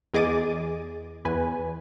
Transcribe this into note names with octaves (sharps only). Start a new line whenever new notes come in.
E2 G#4 D#5 D6 A6 D#7
E2 B4 G#5